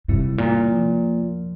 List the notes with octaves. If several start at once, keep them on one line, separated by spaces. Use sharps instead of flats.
G#2 C3 G3 C4 E4
A#2
F3